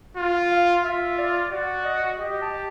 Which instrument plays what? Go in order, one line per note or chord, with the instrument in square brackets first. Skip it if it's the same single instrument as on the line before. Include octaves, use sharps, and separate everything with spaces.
[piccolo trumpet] F4
[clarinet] F5
[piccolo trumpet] F4 [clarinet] E5
[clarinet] D5
[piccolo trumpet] F#4 [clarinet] D5
[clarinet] D#5
[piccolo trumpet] G4 [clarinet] D#5
[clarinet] A5